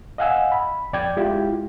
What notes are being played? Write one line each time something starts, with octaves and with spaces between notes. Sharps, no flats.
D#5 F5 F#5 G#5 E6
B5
F2 D5 G5 G#6
G#3 E4 F4 G4